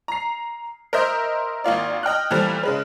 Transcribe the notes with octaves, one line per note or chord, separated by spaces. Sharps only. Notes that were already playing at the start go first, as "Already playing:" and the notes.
A#5 C7
A#4 C5 D#5 E5 G6
G#1 A#3 F4 D5
D#5 G5 F6 F#6
A#2 E3 F3 G3 A3
C#3 G#3 B4